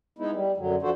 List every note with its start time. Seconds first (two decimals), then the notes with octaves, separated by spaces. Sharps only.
0.19 G#3 B3 D#4 E4
0.33 G3
0.57 F#2 D3 F#3
0.82 F3 D4 F#4 A4 C5